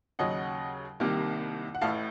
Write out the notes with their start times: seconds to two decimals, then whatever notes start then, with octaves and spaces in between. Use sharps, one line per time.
0.19 D#2 C#3 F#3 D#5 F#5
1.00 C2 C3 D#3 A#3
1.75 F#5
1.81 A1 A2 A3 F5 A5